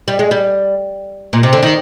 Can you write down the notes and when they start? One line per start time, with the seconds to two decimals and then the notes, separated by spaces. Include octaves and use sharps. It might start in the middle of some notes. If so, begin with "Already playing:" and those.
0.08 G3
0.19 G#3
0.31 G3
1.33 A#2
1.43 C3
1.53 D3
1.63 D#3